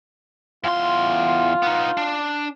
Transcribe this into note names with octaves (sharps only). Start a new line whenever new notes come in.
E2 F4 C6
B3 D#4
D4